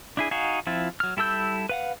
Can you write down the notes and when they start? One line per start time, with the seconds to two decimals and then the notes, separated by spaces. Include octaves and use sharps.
0.17 D4 E4 G#4
0.31 D#4 F#4 F5 G#5
0.67 F3 C4 E4 F4
1.00 F#3 F6
1.17 G3 E4 A4 E6 G6
1.69 B4 F5 F#5